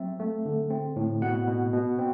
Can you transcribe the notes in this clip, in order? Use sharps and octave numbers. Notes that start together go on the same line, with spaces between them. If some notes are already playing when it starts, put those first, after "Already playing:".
Already playing: F#3 C4 E5
A3
D3
C4
A2
B2 F#5
B2
B2
C4